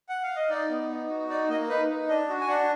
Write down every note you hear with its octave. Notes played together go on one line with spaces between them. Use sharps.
F#5
F5
D#5
D#4 D5
B3
D#4
F#4
D#4 D5
A#3 D#5
D#4 B4
D#4
D4 D#5
F#4
G#5
D4 F#5